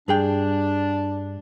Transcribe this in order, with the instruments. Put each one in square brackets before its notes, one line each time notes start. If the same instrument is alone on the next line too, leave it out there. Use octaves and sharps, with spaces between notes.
[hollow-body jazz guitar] G2 G#4 G5 [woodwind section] D4